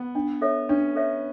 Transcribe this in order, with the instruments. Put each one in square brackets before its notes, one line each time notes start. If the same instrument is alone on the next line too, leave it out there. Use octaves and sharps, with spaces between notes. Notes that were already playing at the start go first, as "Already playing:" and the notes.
Already playing: [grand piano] B3
[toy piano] D4
A4 C#5 E5
[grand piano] C#4 [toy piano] D4
[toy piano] A4 C#5 E5